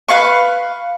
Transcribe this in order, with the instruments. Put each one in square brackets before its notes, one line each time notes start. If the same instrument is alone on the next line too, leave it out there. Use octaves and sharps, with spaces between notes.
[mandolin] B4 F5 B5 C#6